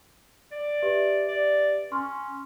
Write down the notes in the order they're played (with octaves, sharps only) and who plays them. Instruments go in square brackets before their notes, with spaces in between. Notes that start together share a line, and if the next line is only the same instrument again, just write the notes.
[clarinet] D5
[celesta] G4 B4 E5
[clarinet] D5
[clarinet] C#4 [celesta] C6 C#6 F6